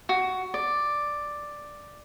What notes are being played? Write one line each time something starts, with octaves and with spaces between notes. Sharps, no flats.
F#4
D5